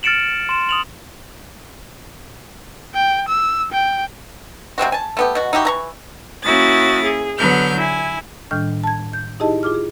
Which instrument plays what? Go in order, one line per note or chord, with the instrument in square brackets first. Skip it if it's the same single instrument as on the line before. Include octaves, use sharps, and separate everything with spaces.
[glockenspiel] F6 A6 C#7 D7 E7 F#7
C6 E7
D#6 F7 F#7
[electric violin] G5
E6
G5
[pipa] C3 G#3 C4 F#4
G#5 A5
A3 B3 G4
B2 F#4
D#4 E4 F#4 G4
E3 A#5 C#6
[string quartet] A#3 C#4 E4 F#4 D#6 A6
G#4
D3 F#3 B3 F6 G6
E4 G#5
[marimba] A2 D#3 G3 D4 F6 G6
A5 G#6
G6
D#4 E4 G4 G#4 D#5 A5
F4 G#4 D6 F6
G#4